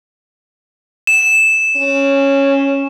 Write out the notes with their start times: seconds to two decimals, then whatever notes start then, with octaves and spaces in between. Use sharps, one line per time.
1.07 E7
1.76 C#4